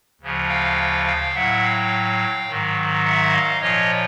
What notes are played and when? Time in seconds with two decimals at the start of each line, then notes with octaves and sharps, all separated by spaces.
0.21 D2 C#3 F3
0.49 F5 G5
1.05 F5 G5
1.34 A2 F#3 E5 F#5
1.62 F5 G5
2.47 G#2 D#3 F#3
3.04 E5 F#5
3.32 D#5 F5
3.60 A#2 F3 C#5 D#5